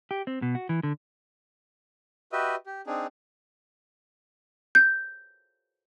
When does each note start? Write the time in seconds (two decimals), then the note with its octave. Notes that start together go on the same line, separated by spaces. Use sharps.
0.11 G4
0.27 C4
0.42 B2
0.55 F#4
0.69 E3
0.83 D3
2.32 F#4 G4 B4 D#5 E5
2.66 G4
2.87 C4 D4 D#4 G#4
4.75 G6